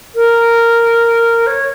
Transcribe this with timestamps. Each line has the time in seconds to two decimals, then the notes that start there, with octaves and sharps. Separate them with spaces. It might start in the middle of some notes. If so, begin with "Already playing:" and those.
0.15 A#4
1.47 C#5